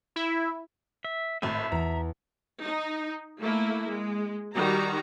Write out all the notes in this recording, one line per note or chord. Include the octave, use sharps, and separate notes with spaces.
E4
E5
G#1 A2 E5 A5 D#7
E2 A#5
D#4
A3 A#3 E4
G#3
D#3 G3 F#4 A#5